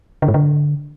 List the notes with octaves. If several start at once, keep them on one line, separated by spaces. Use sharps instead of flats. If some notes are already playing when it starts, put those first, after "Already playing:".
D3
G#2
D3